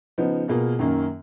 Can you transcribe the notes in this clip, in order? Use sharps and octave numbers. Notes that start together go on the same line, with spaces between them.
C#3 F3 B3 D#4
B2 A#3 F4 G#4
F#2 D#3 A#3 C#4